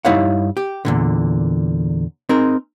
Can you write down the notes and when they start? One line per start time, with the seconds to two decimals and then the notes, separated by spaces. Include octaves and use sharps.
0.05 G2 D#4 E4 C#5 F5 F#5
0.57 G4
0.85 E2 A#2 D3
2.29 C4 D#4 G#4 A#4